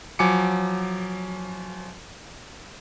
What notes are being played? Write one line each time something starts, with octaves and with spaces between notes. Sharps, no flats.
F3 F#3 G#5 D6 C#7